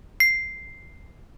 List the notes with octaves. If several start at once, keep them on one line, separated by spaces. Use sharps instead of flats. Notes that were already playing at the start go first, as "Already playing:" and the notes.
C7